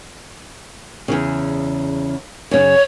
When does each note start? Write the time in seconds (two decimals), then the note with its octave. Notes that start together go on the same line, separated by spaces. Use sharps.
1.08 E2 G2 C#3
2.51 F#2 C#3 C#5